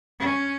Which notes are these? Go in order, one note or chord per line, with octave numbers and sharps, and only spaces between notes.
C#4